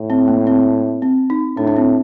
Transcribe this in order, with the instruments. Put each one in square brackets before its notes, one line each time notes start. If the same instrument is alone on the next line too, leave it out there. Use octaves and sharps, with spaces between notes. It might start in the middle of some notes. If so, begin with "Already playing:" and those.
Already playing: [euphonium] A2
[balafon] C4
A#3
C4
C4
D#4
[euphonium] A2 [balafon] D4
[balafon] D4
C4